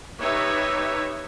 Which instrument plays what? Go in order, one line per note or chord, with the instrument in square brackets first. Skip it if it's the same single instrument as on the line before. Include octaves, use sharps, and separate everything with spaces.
[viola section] D#4 G4 B4 C#5 E5